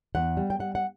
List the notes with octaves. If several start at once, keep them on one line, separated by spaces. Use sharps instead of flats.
E2 F#5
G3
G5
G3 F#5
F#5